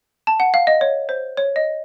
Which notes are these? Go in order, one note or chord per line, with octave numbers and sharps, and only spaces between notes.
A5
F#5
F5
D#5
C#5
C5
C#5
D#5